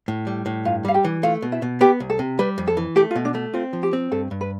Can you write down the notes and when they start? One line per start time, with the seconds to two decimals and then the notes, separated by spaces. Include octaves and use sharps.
0.08 A2
0.27 G3
0.46 A2
0.65 G2 F4 F5
0.85 G3 F5
0.94 G4 G5
1.04 E3
1.23 A3 F4 F5
1.42 B2
1.52 E4 E5
1.62 B2
1.81 B3 G4 G5
2.00 C2
2.10 A4
2.19 C3
2.39 G3 B4
2.58 F2
2.67 A4
2.77 E3
2.96 A3 G4
3.11 F4
3.15 B2
3.25 D4
3.35 A3
3.54 C4 F4
3.73 F3
3.83 G4
3.93 C4
4.12 G2 A4
4.31 G2
4.41 B4